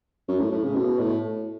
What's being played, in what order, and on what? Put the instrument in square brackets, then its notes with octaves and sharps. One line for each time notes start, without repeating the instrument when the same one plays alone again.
[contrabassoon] F#2
A2
A2
C#3
B2
A2